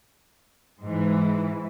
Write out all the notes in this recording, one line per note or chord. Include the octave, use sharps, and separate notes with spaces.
G#2 E3